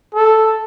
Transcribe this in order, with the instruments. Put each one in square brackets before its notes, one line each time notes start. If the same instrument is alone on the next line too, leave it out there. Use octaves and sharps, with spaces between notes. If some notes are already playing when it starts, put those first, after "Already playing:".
[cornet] A4